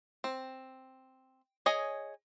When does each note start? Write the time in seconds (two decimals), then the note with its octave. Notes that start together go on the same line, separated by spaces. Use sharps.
0.24 C4
1.66 G#4 C#5 D#5 G#5